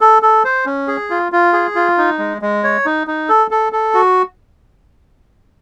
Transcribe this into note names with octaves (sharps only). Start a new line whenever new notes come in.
A4
A4
C5
C#4
G#4
F4
F4
G#4
F4
D#4
G#3
G#3
C#5
D#4
D#4
A4
A4
A4
F#4